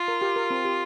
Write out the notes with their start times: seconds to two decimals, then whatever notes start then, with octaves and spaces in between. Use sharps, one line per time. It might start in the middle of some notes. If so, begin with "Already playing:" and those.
Already playing: F4
0.08 A#4
0.21 G4
0.36 A#4
0.50 C4
0.65 G4